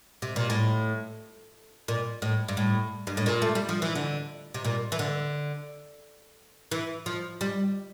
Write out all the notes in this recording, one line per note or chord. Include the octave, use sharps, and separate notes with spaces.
C3
A#2
A2
A#2
A2
G2
A2
G2
A2
A#2
A3
G3
F3
E3
D3
C3
A#2
E3
D3
E3
F3
G3